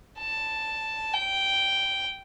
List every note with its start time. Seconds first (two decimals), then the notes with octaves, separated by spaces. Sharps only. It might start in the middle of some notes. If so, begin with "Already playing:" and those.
0.18 A5
1.14 G5